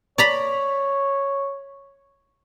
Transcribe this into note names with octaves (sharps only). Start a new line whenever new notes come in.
C#5 D5 A#5 B5